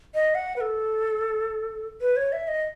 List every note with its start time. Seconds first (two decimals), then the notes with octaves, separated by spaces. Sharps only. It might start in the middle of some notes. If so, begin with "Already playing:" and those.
0.15 D#5
0.35 F#5
0.56 B4
0.61 A4
2.01 B4
2.16 C#5
2.32 E5
2.48 D#5